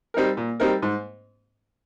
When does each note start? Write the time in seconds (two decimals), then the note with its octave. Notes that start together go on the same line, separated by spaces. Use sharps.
0.14 G3 C4 D#4 A#4
0.37 A#2
0.60 G3 C4 D#4 A#4
0.82 G#2